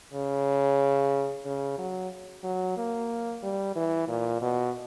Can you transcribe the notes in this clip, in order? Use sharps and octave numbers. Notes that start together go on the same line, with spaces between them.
C#3
C#3
F#3
F#3
A#3
G3
E3
A#2
B2